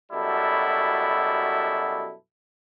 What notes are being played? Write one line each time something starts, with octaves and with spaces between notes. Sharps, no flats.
F#2 B2 G3 E4 A4